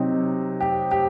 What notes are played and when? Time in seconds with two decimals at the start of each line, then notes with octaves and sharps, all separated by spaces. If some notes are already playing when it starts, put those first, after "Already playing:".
Already playing: C3 F#3 C4 D#4
0.61 G4
0.91 G4